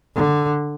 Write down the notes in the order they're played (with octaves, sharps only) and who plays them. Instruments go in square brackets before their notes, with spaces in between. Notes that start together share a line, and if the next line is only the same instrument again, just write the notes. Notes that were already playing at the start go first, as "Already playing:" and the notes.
[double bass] D3